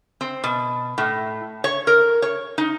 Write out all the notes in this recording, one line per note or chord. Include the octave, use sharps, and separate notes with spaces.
C4
B2
A2
C#5
A#4
C#5
D#4